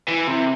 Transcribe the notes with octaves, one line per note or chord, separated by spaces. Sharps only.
E3
C3